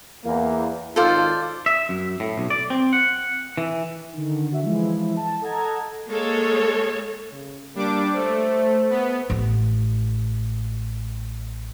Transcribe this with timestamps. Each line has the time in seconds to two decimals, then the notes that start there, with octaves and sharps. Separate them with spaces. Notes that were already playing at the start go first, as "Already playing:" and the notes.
0.24 E2 A#3
0.96 G#1 D#3 F4 A4 C5 D5
1.66 E5
1.89 F#2
2.20 A2
2.38 B1
2.50 D5
2.70 C4
2.93 F#5
3.58 E3
4.13 D3 D#3
4.50 D3 F#4 E5
4.63 E3 F3 G#3 E4
5.17 A5
5.42 A4 D#5 F#5 A5 A#5 G#6
6.10 G#3 A#3 A4 C#5
7.32 C#3
7.75 G3 A#3 D4 D6
8.15 A3 C5
8.90 B3
9.30 A1 E3